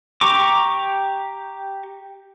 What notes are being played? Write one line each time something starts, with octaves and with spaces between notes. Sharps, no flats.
G4 A#5 C#6 D6